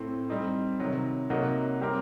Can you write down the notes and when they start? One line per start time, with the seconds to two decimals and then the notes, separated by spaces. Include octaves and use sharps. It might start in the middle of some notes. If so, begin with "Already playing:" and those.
Already playing: A2 A3 C4
0.29 G3 C4 D#4
0.80 C3 D#3 F#3
1.30 C3 F#3 A#3 D#4 F#4
1.80 G3 C4 G4 A#4